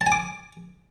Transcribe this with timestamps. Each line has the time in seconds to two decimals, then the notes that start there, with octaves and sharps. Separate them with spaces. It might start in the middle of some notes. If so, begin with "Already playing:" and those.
0.01 A5
0.06 G#5
0.12 D6